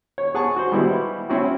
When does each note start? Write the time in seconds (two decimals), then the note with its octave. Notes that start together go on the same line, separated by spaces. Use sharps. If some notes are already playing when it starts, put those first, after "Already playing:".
0.18 C#5
0.34 G#4 F#5 G#5 A5 C#6
0.56 F#4 C5
0.72 G3 G#3 B3 E4 F#4 G#4
1.29 C4 C#4 E4 F#4 G4